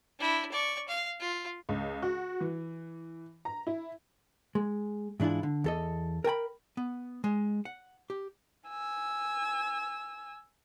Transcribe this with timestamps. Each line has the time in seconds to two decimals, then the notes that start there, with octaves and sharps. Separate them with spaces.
0.19 D4 E4
0.52 D5 C#6
0.88 F5
1.20 F4
1.69 C#2
2.02 F#4
2.40 E3
3.45 A#5
3.67 E4
4.55 G#3
5.20 G#2 E3 D4 E4 F4
5.43 D3
5.64 E2 A4 D#5
6.24 A#4 G5 G#5 B5
6.77 B3
7.24 G#3
7.65 F#5
8.10 G4
8.69 G#5 E6